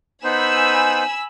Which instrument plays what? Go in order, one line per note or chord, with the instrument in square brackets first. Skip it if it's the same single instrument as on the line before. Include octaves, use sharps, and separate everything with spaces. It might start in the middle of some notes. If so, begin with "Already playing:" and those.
[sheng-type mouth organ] B3 D#4 C5 [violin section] G#5 B5 E6